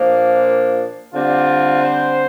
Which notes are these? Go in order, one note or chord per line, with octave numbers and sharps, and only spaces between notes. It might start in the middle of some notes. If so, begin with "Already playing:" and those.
Already playing: A#2 F3 A#3 D4
D3 G3 C4 F4
C5